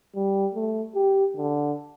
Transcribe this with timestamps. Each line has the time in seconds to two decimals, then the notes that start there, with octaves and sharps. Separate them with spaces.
0.15 G3
0.55 A3
0.95 G4
1.37 D3